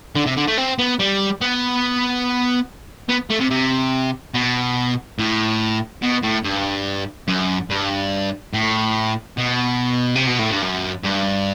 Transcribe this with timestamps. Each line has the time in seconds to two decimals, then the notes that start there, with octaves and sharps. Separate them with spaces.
0.16 D3
0.26 C3
0.37 D3
0.48 A3
0.58 C4
0.79 B3
0.99 G3
1.41 B3
3.09 B3
3.30 A3
3.40 C3
3.50 C3
4.34 B2
5.19 A2
6.03 B2
6.23 A2
6.44 G2
7.28 F#2
7.70 G2
8.53 A2
9.37 B2
10.15 C3
10.27 B2
10.39 A2
10.51 G2
10.63 F#2
11.05 G2